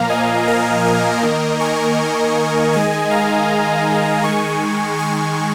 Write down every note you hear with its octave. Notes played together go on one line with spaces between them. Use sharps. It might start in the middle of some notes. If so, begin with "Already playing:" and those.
Already playing: A#2 F3 A#3 F5 A#5
D#5 G#5
A#4 D#5
A#4 D#5
D#3 A#3
G#5 C#6
D#3 G#3 D#5 G#5
F5 A#5
D#3 G#3 G#5 C#6
G#5 C#6